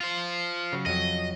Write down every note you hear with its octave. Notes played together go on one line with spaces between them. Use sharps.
F4 C5
C#3 F#3
F2 F#3 D#5